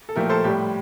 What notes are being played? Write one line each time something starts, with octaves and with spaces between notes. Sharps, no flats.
A4
A#2 F3 A3 G4 A#4
A4 C5
A2 G3 G4